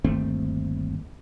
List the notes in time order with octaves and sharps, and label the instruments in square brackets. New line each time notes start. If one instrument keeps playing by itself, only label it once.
[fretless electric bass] G1 D#2 A3 C4